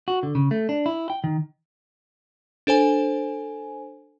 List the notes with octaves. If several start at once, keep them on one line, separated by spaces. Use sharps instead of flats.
F#4
D3
C#3
A3
D4
E4
G5
D#3
D4 A4 C5 G#5